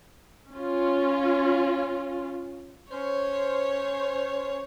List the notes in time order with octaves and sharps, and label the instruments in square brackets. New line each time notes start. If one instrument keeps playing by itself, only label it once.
[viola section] C#4 F4
[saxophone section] C#4 C5 [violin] C#5